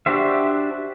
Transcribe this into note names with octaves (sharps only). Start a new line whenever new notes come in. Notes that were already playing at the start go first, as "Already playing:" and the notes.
D4 F#4 G4 C5 E5